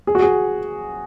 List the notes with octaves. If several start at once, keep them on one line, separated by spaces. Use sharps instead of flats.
G#4
F#4
G#4